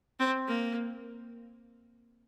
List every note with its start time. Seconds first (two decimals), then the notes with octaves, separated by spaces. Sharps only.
0.20 C4
0.48 A#3